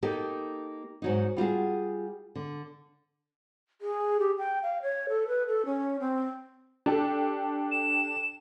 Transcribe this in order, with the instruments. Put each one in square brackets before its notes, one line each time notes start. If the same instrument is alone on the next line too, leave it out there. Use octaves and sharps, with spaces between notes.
[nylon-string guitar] A#3 D#4 G4 A4
G#2 F#3 D#4
G3 F4 F#4 G#4
D3
[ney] G#4
G4
G5
F5
C#5
A4
B4
A4
C#4
C4
[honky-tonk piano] D4 G4 A4
[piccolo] E7